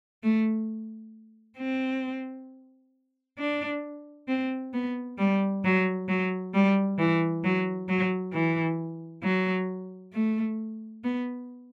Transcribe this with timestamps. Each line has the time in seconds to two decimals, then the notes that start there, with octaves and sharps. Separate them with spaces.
0.23 A3
1.58 C4
3.38 D4
4.28 C4
4.73 B3
5.18 G3
5.64 F#3
6.08 F#3
6.54 G3
6.99 E3
7.44 F#3
7.89 F#3
8.33 E3
9.23 F#3
10.13 A3
11.04 B3